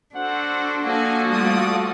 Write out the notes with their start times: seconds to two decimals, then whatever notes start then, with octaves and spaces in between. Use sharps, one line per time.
0.15 D4 F#4 A4 C5 F#5
0.84 F3 A#3 F#4 A4 G#5
1.29 G3 A3 D5 D#6